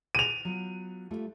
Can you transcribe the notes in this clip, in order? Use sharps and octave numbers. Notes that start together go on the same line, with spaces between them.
D#7 F7
F#3 B3 F4
G3 A3 F4